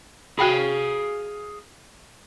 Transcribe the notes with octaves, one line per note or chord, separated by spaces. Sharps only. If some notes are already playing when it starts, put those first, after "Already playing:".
F#4 G#4 F5 G5 G#5 B5